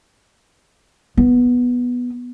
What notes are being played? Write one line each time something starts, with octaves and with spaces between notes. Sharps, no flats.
B3